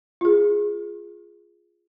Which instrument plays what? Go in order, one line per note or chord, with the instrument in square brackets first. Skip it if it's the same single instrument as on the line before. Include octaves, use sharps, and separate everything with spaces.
[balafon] F4 G#4